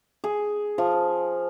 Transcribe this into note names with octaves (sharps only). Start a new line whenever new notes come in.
G#4
F3